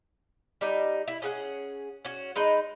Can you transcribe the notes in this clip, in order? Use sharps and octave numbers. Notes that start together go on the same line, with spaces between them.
G3 D#4
E4
C#4 G#4 F#5
C#4 F#4
G#3 D#4 B4